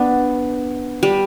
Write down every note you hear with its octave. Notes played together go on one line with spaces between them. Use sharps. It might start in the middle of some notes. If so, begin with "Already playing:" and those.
Already playing: B3 D4
G3